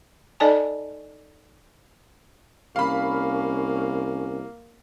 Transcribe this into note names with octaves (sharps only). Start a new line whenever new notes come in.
D#4 A4 D5 D#5 G#5 A5
C2 A#3 C#4 F5 B5